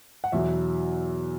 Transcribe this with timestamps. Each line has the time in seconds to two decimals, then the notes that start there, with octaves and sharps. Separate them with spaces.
0.24 F#5
0.32 E2 B2 F#3 E5